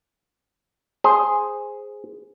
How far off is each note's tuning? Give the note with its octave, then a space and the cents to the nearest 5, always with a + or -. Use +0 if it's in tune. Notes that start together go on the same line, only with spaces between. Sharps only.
G#4 +0 C5 +0